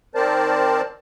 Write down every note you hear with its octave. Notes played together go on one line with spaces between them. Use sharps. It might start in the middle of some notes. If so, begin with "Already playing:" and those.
D#3 C4 A#4 C5 D5 A5